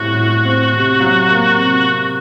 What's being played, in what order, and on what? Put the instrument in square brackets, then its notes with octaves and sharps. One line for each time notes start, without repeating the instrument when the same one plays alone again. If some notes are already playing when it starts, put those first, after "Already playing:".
Already playing: [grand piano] A2 G3 C4 [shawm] F#4
[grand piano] A2
C4
C3
F#3
A#3
C3
C3